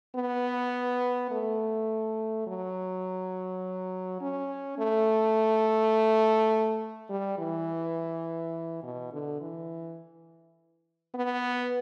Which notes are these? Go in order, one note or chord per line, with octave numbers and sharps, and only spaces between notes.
B3
A3
F#3
C#4
A3
G3
E3
B2
D3
E3
B3